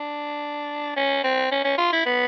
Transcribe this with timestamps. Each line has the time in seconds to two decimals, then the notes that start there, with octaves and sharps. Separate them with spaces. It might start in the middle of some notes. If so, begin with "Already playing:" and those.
Already playing: D4
0.96 C#4
1.24 C4
1.51 C#4
1.64 C#4
1.78 F4
1.93 E4
2.05 B3